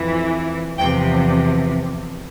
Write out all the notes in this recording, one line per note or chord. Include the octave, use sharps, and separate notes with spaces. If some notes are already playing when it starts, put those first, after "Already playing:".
Already playing: F2 E3
E2 C3 F3 G5